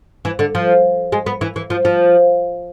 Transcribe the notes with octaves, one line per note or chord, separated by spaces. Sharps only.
E3
D3
F3
G#3
B3
E3
E3
F3
F3